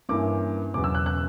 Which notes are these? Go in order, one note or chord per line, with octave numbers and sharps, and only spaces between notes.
G2 E3 A#3 C#4 E4 D6
E1 E2 C#3 F#3 B3 D6
E6
F#6
F#6